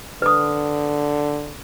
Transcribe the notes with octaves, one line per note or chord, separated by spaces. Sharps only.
D3 B4 D#6